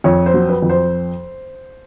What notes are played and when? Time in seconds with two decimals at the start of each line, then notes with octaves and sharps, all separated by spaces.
0.04 F2 C#5
0.26 C5
0.34 F#3
0.49 B4
0.62 F2
0.69 C5